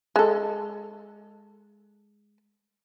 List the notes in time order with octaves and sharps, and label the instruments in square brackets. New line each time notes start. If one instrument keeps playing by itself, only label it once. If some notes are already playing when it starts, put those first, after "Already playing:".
[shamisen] G#3 A4